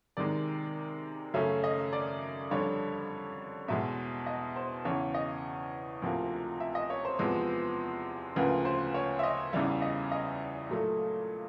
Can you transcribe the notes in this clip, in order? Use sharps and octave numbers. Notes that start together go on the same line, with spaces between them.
C3 D#3 G#3 D5
F#2 C#3 F#3 A3 C#4 E5
D#5
D5
F2 D3 G3 C#5
E2 B2 G#3 E5
D#5
C5
E2 C#3 E3 C#5
D#5
D2 C3 F3 A#3
E5
D#5
C#5
C5
E2 C3 F3 G#3 B3
D2 C#3 F3 A#3 B4
C5
C#5
E5
D#5
E2 C#3 E3 G3 E5
D#5
D#5
A#2 F#3 A3